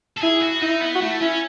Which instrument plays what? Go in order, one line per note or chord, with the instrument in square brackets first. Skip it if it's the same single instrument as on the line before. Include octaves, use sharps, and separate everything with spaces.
[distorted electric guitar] A4
[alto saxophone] E4 [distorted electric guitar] G#4
[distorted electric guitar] F#4
[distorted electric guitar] D#4 [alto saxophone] E4
[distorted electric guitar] B3
[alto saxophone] F#4
[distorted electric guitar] A3 [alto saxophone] E4
[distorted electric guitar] C#4 [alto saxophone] E4